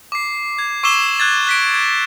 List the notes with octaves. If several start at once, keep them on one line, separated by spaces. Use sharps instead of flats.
D6 C7
G#6
C#6 D6 E6 C7 E7 G7
F#6 G#6 A6
F#6 B6 D7
G#6